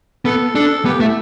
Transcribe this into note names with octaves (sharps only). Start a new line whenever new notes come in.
B3 A4
D4 A4
B3 G4
A3 E4